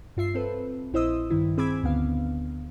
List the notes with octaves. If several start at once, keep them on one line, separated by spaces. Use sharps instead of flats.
G2 F4 E5 C7
C4 A4 B4
A#1 E4 C5 D#5 D#6 E6
G2 D#3 E4
C4 G#4 B5 D6 E6 G#6
D2 D3 B3 F5